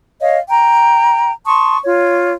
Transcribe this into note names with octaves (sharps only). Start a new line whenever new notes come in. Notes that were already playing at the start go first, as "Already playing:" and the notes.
C#5 D#5 F5
G5 A#5
A5 C6 C#6 D#6
F4 C#5